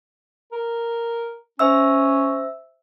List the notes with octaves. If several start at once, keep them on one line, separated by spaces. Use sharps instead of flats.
A#4
C#4 C5 E5 E6